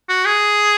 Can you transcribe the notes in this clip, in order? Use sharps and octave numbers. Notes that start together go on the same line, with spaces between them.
F#4
G#4